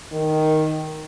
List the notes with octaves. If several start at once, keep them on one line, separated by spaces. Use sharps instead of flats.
D#3